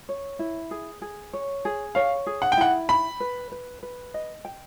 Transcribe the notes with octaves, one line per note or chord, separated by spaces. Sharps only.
C#5
E4
G#4
G#4
C#5
G#4
C#5 F5
G#4
F#5
G5
E4 F#5
G5 B5
B4
B4
B4
D#5
G5